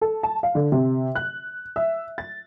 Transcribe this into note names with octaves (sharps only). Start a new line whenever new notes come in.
A4
A5
F5
D3
C3
F#6
E5
A6